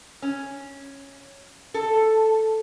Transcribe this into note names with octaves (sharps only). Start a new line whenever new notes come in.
C#4
A4